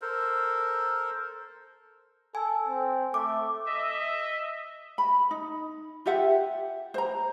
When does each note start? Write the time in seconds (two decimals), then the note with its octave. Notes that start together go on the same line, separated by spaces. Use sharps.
0.02 A4 A#4 C5
2.35 A4 G#5
2.67 C4
3.14 A3 D6
3.68 D#5 E5
4.98 B5
5.31 D#4
6.06 F4 G4 E5 F#5
6.94 C5 A#5